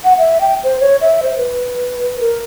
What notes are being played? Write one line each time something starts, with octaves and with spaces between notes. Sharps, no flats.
F#5
E5
G5
C5
C#5
E5
C5
B4
A#4